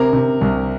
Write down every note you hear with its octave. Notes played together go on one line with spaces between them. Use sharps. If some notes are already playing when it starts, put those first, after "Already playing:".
Already playing: C3 A#4
C3
C2